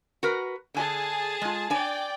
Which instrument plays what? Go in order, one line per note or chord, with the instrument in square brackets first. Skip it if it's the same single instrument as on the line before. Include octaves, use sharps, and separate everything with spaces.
[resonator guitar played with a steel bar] F#4 A#4 B4
[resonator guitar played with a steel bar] D3 G#5 [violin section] G#4 A5
[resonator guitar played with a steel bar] G#3 F4
[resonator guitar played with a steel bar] D4 G#5 [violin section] D5 G5